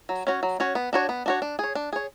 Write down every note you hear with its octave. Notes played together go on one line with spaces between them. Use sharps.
F#3
C#4 F#4 C#5
F#3
C#4 F#4 C#5
B3
D4 F#4 C#5
B3
D4 F#4 C#5
D4
G#4 C#5
D4
G#4 C#5